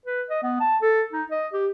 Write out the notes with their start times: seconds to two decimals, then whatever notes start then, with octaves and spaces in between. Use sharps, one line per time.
0.06 B4
0.30 D#5
0.43 B3
0.60 A5
0.82 A4
1.12 D#4
1.31 D#5
1.53 G4